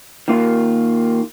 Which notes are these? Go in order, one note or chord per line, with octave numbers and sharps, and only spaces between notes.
D#3 A#3 F4